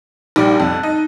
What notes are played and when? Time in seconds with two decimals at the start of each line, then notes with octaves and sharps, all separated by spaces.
0.36 A#1 G3 D#4 D6
0.60 F2 A5 F#6
0.83 D#4